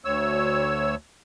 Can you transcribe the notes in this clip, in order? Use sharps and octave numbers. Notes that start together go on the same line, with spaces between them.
D2 C#5 E6